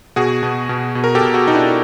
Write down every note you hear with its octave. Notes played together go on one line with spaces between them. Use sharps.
B2 F#4 G#4
B2
B2
B2
A#4
G4 A4
B2
F#4 G#4
B2 D#4
D4 E4